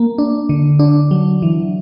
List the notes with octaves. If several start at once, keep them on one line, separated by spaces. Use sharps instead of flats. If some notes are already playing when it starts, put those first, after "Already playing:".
Already playing: A#3
D4
D3
D4
F#3
E3